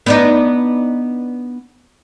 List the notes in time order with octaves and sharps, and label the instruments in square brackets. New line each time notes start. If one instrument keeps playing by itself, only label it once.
[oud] B3 D4 D#4